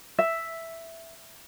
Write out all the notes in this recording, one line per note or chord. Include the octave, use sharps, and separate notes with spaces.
E5